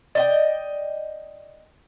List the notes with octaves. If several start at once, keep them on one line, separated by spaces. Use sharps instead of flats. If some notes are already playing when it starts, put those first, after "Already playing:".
D5 D#5 G5